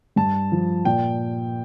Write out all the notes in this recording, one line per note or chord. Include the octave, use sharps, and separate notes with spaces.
G2 A5
F3
A#2 G5